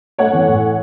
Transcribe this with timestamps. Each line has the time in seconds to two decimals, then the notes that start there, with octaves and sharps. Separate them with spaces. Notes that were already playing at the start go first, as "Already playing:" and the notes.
0.18 A3 C#5 F#5
0.33 E3
0.47 A2